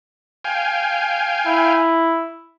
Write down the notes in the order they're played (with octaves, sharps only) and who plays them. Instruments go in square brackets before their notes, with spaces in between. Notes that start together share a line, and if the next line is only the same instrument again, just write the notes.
[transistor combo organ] F5 G5 G#5
[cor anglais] E4